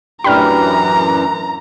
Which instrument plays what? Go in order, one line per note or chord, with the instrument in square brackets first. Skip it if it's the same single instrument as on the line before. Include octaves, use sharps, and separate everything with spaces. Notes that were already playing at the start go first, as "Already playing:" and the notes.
[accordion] F#2 E3 [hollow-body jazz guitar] A2 D4 G4 [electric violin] A#5 [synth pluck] B5 F6